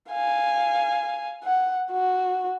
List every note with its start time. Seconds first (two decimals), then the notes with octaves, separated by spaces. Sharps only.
0.10 F5 G#5
1.44 F#5
1.92 F#4